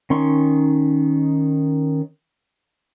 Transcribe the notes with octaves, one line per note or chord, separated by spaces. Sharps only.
D#3 C#4 D#4 C6 C#6